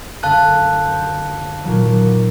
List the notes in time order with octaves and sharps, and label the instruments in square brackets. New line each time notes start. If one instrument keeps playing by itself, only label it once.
[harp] F#2 D3 E6 [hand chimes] F5 A5 F#6
[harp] C5
A#2 D#3 F#3